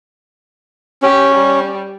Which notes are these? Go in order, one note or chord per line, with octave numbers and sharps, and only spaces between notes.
C#4 G4
G3